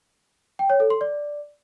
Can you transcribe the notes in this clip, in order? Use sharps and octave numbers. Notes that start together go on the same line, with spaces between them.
G5
C#5
A4
C6
D5